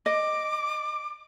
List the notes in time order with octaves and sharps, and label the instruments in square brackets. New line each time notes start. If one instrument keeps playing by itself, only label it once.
[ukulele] D#5 [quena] D6